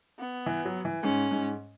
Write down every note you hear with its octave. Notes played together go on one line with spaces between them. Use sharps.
B3
E3
F#3
E3
G#2 C#4
G#2